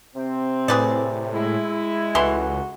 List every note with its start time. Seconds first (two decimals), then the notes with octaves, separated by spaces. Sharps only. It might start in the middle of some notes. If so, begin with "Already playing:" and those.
0.16 C3 C4
0.68 A2 G#4 B4 D5
1.34 G#3 E4
2.15 C#2 E3 A3 F#4 C6